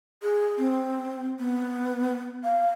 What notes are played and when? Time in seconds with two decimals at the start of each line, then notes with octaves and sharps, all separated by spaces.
0.23 G#4
0.58 C4
1.40 B3
2.44 F5